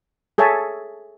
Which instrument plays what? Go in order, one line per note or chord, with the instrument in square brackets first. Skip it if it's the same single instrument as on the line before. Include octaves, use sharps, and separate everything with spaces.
[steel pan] G#4 A4 C#5 E5 G#5 A5